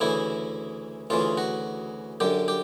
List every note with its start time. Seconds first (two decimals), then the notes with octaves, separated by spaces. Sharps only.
0.01 D2 C#3 E3 E4
1.10 D2 C#3 E3 F4
1.38 F#4
2.20 F#2 D3 G4
2.48 G4